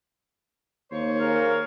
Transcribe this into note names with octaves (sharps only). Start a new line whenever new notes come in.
D#2 A#3 C5 C#5
G#4 A#4 F5